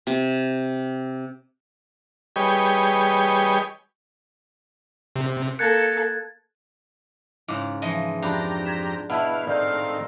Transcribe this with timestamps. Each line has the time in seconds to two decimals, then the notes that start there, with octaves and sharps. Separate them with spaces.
0.07 C3
2.36 G3 G4 G#4 B4 C#5 D#5
5.16 C3
5.59 A#3 A4 F#6 G#6 A6 C#7
7.48 G#2 C#3 E4 D6
7.82 E3 F3 D#5 F5
8.22 F2 D4 G4 A#5 B5 F7
8.65 G#6 B6 E7
9.10 B2 B3 E4 F5 F#5 A5
9.47 A2 D#3 C4 A#4 D5 F5 G6